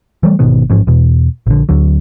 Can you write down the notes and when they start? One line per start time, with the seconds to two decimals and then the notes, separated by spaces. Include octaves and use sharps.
0.23 E3 G3 A3
0.39 G#1 B2 D#3 B3
0.70 A1 G#2 F3 C#4
0.87 E2 B2
1.47 A#1 D3
1.69 D2 D3 F#3